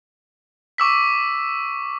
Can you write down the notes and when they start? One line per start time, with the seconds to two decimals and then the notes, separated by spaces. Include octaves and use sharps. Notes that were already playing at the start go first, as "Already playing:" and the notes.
0.78 C#6 D6 E6 B6